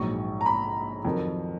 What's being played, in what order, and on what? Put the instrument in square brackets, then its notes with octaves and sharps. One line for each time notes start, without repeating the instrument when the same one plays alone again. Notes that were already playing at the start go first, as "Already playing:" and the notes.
Already playing: [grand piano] A#1 G#2 F#3 C#6
A#5
B5
F2 D#3 F#3